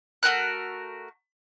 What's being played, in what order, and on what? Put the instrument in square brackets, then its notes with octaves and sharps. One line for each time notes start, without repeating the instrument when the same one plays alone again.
[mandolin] A3 F#4 A#4 F#6